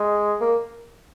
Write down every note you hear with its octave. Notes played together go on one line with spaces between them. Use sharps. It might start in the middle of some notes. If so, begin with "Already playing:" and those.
Already playing: G#3
A#3